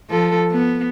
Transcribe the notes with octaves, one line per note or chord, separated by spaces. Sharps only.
F3 A4
B3